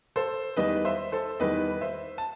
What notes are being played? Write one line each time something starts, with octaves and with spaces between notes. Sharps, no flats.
A4 C5
E2 D#3 G3 B4 D#5
C5 E5
A4 C5
E2 D#3 G3 B4 D#5
C5 E5
A5